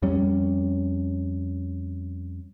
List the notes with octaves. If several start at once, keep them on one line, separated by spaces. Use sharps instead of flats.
F2 G3 C#4